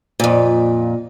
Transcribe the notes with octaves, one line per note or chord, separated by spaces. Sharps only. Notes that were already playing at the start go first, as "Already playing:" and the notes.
F2 A#2